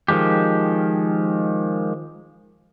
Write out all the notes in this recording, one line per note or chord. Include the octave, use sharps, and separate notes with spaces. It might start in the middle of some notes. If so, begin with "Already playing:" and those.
D#3 F3 G#3 G4